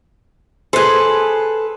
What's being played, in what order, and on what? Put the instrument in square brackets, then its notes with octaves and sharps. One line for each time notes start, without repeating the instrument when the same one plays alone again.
[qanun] G#4 C5 [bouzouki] A4 B4